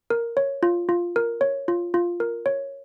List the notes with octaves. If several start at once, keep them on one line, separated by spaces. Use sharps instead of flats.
A#4
C#5
F4
F4
A#4
C#5
F4
F4
A#4
C#5